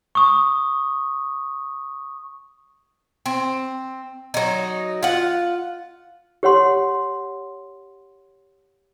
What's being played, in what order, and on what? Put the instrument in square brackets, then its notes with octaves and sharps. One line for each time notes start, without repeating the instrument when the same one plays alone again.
[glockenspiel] C#6 D#6
[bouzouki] C4
F#3 D#4
F4 F#5
[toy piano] G4 C#5 F#5 C6